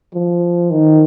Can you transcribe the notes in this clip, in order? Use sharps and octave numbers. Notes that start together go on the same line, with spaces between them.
F3
D#3